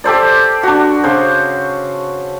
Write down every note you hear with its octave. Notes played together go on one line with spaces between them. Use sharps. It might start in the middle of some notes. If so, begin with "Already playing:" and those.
G4 A4 C5 D5
D4 F#4
C#3 C5